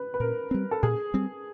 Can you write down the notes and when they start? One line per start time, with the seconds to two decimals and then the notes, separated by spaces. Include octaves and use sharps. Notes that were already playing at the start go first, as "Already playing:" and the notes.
Already playing: B4
0.14 B4
0.20 A#2 A#4
0.51 G3 C4
0.71 A4
0.83 A#2 G#4
1.14 G3 C4